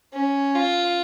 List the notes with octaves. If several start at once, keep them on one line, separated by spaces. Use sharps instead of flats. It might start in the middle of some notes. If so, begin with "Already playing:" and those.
C#4
F4